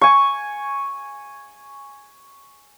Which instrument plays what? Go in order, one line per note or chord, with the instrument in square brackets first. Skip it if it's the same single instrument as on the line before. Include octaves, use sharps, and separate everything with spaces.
[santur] G#5 C#6